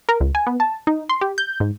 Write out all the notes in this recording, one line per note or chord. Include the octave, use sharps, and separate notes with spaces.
A#4
C#2
G#5
B3
A5
D#4
C6
G4
G6
G#2